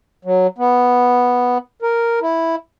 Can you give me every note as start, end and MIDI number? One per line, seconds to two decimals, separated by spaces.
0.25 0.47 54
0.58 1.58 59
1.82 2.19 70
2.22 2.56 64